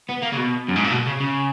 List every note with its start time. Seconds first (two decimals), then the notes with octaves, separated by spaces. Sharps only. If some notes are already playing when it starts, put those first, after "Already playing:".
0.09 B3
0.22 A#3
0.32 C#3
0.37 B2
0.68 F#2
0.76 G#2
0.84 A#2
0.92 B2
1.07 C#3
1.20 C#3